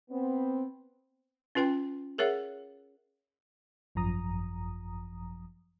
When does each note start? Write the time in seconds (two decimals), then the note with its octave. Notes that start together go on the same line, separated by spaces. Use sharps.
0.11 B3 C4
1.55 C#4 F4 B4 G5 C6
2.18 G#4 A#4 C#5 E5 F#5
3.95 G#1 F#2 F3 A#5 D#6